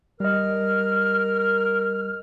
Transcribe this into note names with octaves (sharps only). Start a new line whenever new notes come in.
G3 A#4 D#5 F6